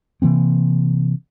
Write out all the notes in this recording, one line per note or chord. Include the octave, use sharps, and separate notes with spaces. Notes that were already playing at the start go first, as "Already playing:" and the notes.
C3 E3 A#3 C4